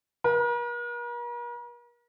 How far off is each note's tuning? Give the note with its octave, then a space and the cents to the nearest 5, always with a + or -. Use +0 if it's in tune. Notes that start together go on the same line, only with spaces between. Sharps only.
A#4 +45